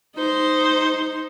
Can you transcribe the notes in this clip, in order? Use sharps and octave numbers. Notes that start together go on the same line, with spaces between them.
D#4 C5